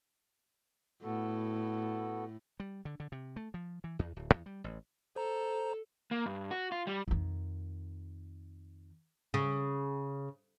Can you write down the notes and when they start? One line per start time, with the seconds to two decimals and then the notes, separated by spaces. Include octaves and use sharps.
1.03 A2 B3 F#4 A4
2.60 G3
2.85 D3
3.00 D3
3.12 C3
3.36 A3
3.54 F3
3.84 E3
3.99 E2
4.16 D1
4.34 E2
4.46 G3
4.64 A1
5.16 A4 C5 A#5
6.11 A#3
6.26 G2
6.51 F#4
6.72 F4
6.87 G3
7.08 F2 D#3
9.34 C#3